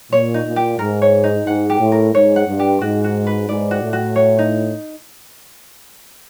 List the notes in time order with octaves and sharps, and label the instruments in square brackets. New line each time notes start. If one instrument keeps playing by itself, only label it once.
[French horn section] A#2 [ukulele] C#5
[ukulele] D#4
[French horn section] A#2
[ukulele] G4
[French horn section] G#2 [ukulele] A#4
[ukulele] C#5
D#4
[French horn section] G#2 [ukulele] F#5
[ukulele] G4
[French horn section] A2
[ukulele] A#4
[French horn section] G#2 [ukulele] C#5
[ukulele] F#5
[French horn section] G2
[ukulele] G4
[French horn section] G#2 [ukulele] F#4
[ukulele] F#4
B4
[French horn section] G#2 [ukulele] D5
[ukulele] F#4
[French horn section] A2
[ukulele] F#4
C#5
D#4